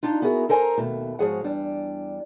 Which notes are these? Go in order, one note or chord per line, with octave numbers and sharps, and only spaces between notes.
D4 D#4 F4
B3 E4 F#4 G#4 A#4
A4 A#4 C5 G#5 A#5
D#2 B2 A3
G#2 F3 F#4 G#4 C#5 F#5
E2 G3 D4